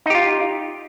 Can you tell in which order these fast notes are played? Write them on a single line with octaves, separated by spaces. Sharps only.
D#4 G4 F4